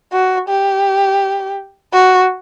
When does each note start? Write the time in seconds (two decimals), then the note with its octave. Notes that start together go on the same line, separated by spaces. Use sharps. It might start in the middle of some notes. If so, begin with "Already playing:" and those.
0.13 F#4
0.49 G4
1.93 F#4